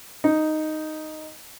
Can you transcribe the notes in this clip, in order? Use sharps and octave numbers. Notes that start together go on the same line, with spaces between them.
D#4